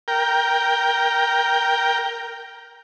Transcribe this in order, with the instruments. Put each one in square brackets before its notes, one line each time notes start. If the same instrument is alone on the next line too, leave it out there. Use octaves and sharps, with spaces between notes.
[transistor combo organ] A#4 G5